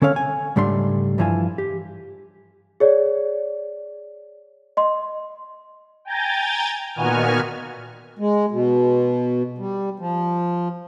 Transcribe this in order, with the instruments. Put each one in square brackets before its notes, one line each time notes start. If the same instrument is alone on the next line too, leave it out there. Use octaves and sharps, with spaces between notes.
[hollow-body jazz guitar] D3 C#4 A4 C#5 F5
G#5
C#2 G#2 G3 A3 D4 C6
G2 E3 F3 E4 G#5
G4
[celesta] G#4 C#5 D5
D#5 C6
[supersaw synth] G5 G#5 A#5 G6 A6
A#2 D#3 B3 F#4 G#5 F6
[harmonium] G#3
B2
G3
F3